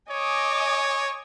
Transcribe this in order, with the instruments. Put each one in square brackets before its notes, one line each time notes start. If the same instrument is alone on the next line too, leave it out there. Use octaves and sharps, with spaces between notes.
[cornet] C#5 [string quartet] D#5 G#5 D6